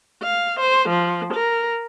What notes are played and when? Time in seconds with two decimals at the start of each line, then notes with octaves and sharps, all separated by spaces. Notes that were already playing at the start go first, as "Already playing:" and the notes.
0.22 F5
0.59 C5
0.90 F3
1.33 A#4